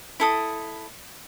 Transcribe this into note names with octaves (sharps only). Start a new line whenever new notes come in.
E4 A4 D#6